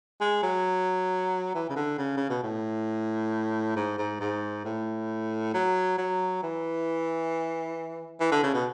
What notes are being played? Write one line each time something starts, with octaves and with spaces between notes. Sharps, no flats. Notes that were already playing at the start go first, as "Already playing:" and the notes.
G#3
F#3
E3
C#3
D3
C#3
C#3
B2
A2
G#2
G#2
G#2
A2
F#3
F#3
E3
E3
D3
C#3
B2